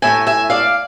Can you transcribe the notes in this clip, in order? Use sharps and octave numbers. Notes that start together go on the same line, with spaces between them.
A2 E3 A3 E5 G#5
E5 G#5
D5 F5